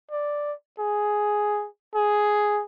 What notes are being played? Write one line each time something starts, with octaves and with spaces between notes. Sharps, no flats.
D5
G#4
G#4